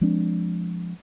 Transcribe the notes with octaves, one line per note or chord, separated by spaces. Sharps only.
F3 G#3 C4 D4